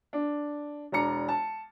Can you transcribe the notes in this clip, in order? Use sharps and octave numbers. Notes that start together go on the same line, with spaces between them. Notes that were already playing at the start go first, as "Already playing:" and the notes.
D4
E1 D4 A#5 C#7
A5